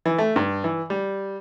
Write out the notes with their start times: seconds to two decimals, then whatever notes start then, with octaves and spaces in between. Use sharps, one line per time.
0.05 E3
0.18 A3
0.36 G2
0.64 E3
0.90 G3